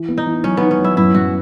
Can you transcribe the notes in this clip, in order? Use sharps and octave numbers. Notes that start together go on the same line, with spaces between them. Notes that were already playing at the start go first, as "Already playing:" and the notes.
Already playing: E3
B3
D#4
E3
F#3 C#4
D#3 B3
C#4
F#3
E4
F#2 E4
F#2 F#4